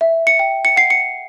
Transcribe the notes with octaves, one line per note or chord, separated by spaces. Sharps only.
E5
C#7
G5
C#7
F#5 C7
C#7